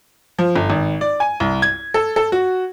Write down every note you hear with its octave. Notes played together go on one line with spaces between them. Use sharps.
F3
G1
G#1
D5
G#5
C2
G#6
A4
A4
F#4